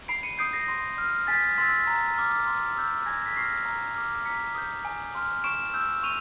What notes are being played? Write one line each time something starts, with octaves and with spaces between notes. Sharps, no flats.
B5 C7 D7
C#7 D#7
D#6 G6 C7 D7
A#6 C7
C6
F6
G#5 A6 B6
C6 E6 A6 B6
A#5
D6 F6
C6
E6 G6
G#5 G#6 A#6
B6
C#6 F6 A#6 C7
A#5
D6 F6
A#5 B6 C#7
D#6 G6
G#5
C6 F6
C#6 D7 E7
E6 G6
C#6 D#7 F7